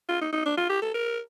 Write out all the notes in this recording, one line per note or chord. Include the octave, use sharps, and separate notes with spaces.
F4
D#4
D#4
D4
F4
G4
A4
A#4